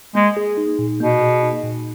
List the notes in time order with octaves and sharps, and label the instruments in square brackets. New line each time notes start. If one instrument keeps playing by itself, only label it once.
[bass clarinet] G#3 [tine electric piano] A#3
[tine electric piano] G#4
D#4
A#2
[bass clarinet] B2 [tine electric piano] A#3
[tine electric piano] G#4
D#4
A#2